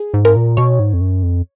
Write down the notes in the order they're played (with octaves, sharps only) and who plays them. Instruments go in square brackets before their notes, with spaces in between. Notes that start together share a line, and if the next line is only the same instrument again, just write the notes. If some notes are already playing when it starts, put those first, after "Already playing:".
Already playing: [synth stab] G#4
[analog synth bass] G#2
[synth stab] A#4
[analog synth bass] A#2
[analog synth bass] B2 [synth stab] C#5
[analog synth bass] G#2
F2
F#2
F2